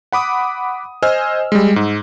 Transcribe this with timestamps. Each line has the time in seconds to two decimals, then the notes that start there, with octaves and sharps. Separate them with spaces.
0.12 F#5 B5 D6 D#6
1.03 C5 D#5 G#5 E6 F6
1.52 G3 G#3
1.76 G#2